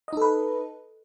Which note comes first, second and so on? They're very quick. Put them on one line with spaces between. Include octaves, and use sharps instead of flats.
D#5 D#4 A4 B4